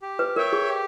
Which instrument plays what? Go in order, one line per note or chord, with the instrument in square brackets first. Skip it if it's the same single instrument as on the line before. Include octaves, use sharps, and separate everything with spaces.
[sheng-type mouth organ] G4
[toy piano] B4
[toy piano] A#4 [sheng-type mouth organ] C#5 E5 G5
[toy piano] G#4
[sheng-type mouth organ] G4